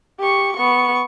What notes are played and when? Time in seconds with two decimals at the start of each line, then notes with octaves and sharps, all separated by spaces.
0.20 G4 C#6
0.57 B3 C#6